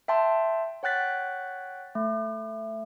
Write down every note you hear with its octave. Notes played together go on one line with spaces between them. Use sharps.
E5 G5 A5 C6
C#5 F#5 G5 F#6 A6 B6
A3